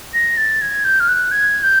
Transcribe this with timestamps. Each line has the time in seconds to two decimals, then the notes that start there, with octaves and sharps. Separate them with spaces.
0.14 A#6
0.37 A6
0.62 G#6
0.85 G6
1.00 F6
1.08 F#6
1.32 G#6
1.63 G6